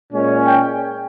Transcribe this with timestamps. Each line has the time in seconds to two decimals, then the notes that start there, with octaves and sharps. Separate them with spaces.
0.11 A#2 G#3 C#4
0.46 G5